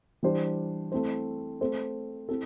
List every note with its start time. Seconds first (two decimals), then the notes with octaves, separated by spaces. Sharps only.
0.23 E3 G3 D4 C5
0.92 A3 C4 E4 C5
1.61 A3 C4 A4 C5
2.29 C4 E4 A4